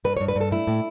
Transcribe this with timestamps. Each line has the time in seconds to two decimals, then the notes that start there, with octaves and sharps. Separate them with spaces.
0.04 G2 B4
0.17 G2 C#5
0.28 B4
0.35 G2
0.41 A4
0.51 A2 E4
0.67 A2